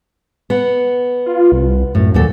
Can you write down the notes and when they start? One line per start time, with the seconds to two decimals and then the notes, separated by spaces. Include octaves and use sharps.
0.50 B3 F#5
1.26 F4
1.52 C2
1.95 F#2 A2
2.14 D#2 A#2 F#3 A4